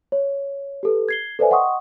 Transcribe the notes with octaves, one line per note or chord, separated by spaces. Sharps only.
C#5
G4 A4 B4
G#6 C7 G7
A4 B4 C5 D5 E5 G#5
D#5 F#5 G5 C6 C#6 D#6